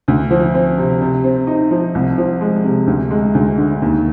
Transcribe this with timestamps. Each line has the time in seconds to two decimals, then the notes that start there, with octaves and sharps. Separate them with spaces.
0.08 D2
0.30 F3
0.54 C4
0.78 C3
1.01 C3
1.24 C4
1.47 D#4
1.71 F3
1.95 C2
2.18 F3
2.41 G#3
2.65 C3
2.87 D2
3.11 G#3
3.35 D2
3.58 D3
3.82 D#2